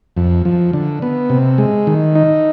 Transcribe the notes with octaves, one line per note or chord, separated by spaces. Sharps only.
F2
F3
D3
B3
C3
G#3
D#3
D#4